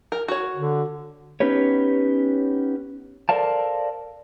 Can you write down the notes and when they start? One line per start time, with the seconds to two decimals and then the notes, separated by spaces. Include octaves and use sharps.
0.12 A#4
0.28 F#4 C#5
0.55 D3
1.40 B3 C#4 D#4 G4 B4 C#5
3.29 A4 A#4 C5 D5 F5 A5